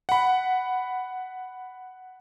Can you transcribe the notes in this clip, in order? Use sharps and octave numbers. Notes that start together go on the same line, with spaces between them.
F#5 B5